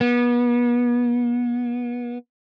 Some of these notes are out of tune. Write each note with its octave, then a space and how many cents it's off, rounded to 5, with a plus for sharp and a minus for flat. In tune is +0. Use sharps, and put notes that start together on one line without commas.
B3 -35